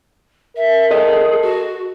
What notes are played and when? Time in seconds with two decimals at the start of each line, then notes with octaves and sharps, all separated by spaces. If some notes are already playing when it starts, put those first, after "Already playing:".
0.56 A#4 E5
0.91 G#4 A4 D#5
1.43 F#4